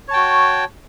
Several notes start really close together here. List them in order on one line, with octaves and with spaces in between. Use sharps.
C#5 A5 G5 F#4